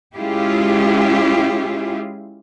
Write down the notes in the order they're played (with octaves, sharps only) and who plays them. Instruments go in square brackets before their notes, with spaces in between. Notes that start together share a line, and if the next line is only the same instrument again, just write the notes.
[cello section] G#3 C#4 E4 F4 G4 G#4